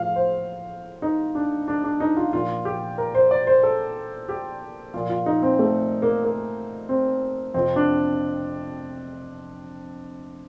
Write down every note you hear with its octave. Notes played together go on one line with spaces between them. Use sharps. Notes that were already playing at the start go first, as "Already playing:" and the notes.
Already playing: A2 F3 F5
C5
D#4
D4
D4
D4
D#4
F4
A#2 F3 F4
G4
A#4
C5
D5
C5
A4
G4
A#2 F3 F4
F4
D#4
C4
A3
A#3
A#3
C4
F2 C3 F3 C4
D4